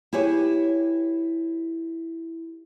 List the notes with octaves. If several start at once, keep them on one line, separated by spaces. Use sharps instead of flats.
E4 G4 G#4 B4 C#5